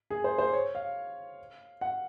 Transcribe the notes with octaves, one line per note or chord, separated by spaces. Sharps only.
G#4
C5
C5
C#5
F5
F#5